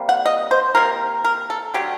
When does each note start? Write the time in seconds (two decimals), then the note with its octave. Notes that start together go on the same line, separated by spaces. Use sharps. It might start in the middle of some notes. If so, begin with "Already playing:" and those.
Already playing: C3 G3 A#3
0.09 F#5
0.26 D#5
0.51 C5
0.75 C3 F#3 A#3 A#4
1.24 A#4
1.50 A4
1.74 D3 F#3 A3 G4